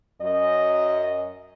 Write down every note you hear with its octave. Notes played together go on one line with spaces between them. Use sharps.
F#2 D#5